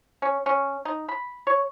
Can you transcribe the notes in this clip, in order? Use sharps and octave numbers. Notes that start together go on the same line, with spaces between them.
C#4
C#4
D#4
B5
C#5